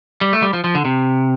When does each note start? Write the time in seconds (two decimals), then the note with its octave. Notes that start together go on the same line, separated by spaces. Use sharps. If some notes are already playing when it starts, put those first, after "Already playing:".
0.21 G3
0.33 A3
0.42 G3
0.53 F3
0.64 F3
0.75 D3
0.85 C3